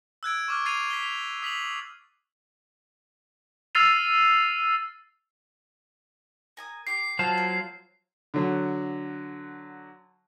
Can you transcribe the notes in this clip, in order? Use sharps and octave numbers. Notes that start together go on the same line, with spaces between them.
E6 F#6 G#6 D7
C#6 D6 F6
G#6 A6 C7 D#7 F7
B6 G7
F7
D#6 B6 F7 F#7
E6 F6 A6 C7 D#7 F7
A#4 G#5 D#6
G4 C#6 D6 C7
F#3 F4 C5 A5 F6
A#3
D3 F#3